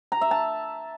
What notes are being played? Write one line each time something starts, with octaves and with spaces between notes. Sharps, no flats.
A#5
E5
A5